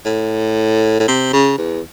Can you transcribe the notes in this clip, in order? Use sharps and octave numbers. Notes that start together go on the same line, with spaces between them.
A2
A2
C3
C#3
E2